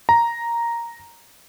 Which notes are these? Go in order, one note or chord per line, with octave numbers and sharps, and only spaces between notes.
A#5